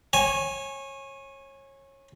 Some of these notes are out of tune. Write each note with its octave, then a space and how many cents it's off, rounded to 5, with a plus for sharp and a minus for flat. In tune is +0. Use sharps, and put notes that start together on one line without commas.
C#5 -25 G#5 +0